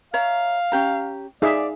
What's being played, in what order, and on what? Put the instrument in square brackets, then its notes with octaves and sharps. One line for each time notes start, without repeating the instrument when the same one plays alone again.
[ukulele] C#5 E5 A#5 [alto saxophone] F5
[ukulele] C#4 G4 A#5
[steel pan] D#4 G#4 E5 [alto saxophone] D5 [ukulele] F5